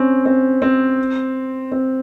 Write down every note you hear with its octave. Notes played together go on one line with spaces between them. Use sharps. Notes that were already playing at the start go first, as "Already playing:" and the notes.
Already playing: C4 C#4
C4
C4
C4